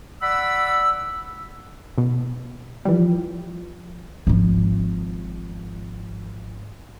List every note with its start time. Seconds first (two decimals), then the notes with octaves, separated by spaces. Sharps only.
0.22 D5 F#5 B5 E6
1.98 B2
2.85 E3 F3 G3
4.27 G#1 F3